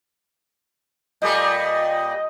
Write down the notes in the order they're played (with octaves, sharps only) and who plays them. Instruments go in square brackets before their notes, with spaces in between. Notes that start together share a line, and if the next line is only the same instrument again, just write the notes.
[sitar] A#2 G3 A3 [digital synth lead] D#5